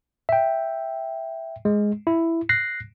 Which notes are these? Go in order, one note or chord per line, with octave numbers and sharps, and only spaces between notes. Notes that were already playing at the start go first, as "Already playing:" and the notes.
E5 G5
G#3
E4
F#6 A#6 C7